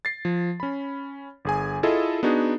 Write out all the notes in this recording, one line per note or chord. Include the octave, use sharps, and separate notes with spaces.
A6 C7
F3
C#4 B5
G1 G#4 G#5
E4 F4 G#4 A4 D#5
B3 D4 D#4 F#4 G#4